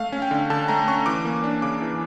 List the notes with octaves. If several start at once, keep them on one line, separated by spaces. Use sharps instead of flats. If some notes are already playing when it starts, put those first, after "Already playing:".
Already playing: A3 F5
C#4
G5
D3
D3 A5
A3 A#5
C#4 C#6
E3 D6
A#3
D4
C#3 D6
E3